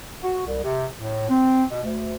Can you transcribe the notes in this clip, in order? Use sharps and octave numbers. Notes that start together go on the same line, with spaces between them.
F#4
C2
C3
A2
C4
B2
D2